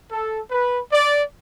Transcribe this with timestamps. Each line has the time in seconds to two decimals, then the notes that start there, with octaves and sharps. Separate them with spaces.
0.11 A4
0.51 B4
0.92 D5